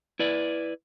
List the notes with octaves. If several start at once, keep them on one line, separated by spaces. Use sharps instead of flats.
E4 B4 D5